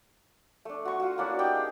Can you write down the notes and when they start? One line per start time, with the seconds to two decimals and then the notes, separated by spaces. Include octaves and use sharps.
0.65 A3 D4
0.85 F#4 C#6
1.00 F4 F#4
1.18 A#3 C#4 D4 E4
1.39 D#4 G4 D5 G5
1.55 G#4